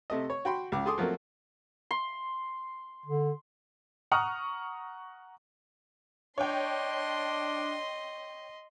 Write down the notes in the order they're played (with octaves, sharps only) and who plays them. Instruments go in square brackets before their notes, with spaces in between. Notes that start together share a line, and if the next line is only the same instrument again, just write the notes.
[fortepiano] C3 A3 D#5
C#5
F#4 G5 B5 C6
C#2 C#3 D6
G#4 A4 C6 D6 D#6
F3 F#3 A3 A#3 C4
[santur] C6
[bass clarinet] D3
[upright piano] F#5 A#5 C#6 D#6 F6
[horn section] D4 [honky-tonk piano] C#5 G5 [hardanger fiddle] D#5 C6